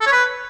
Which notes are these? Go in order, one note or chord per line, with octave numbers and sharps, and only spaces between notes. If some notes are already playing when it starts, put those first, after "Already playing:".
A4
C#5
B4